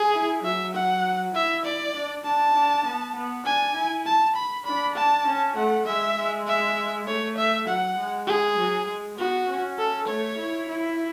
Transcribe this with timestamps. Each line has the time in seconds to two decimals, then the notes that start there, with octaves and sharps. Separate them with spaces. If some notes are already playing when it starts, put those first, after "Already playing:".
Already playing: G#4
0.14 E4
0.44 F#3 E5
0.75 F#5
1.35 E4 E5
1.65 D5
1.95 D4
2.24 D4 A5
2.55 D4
2.85 B3
3.15 B3
3.45 D4 G#5
3.75 E4
4.06 A5
4.36 B5
4.65 D4 B5
4.95 A5
5.27 C#4
5.56 A3 F#5
5.86 G#3 E5
6.17 G#3
6.47 E5
7.07 A3 C#5
7.38 E5
7.68 F#3 F#5
7.97 G#3
8.27 G#4
8.57 F#3
8.87 G#3
9.17 B3 F#4
9.48 C#4
9.78 A4
10.08 A3 C#5
10.38 E4
10.68 E4